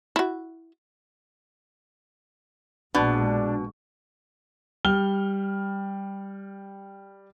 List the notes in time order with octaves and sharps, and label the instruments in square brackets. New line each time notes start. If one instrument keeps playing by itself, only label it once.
[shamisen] E4 F#4
[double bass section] A#1 G#3 [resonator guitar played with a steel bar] B2 [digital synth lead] D4
[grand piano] G3 F6 G7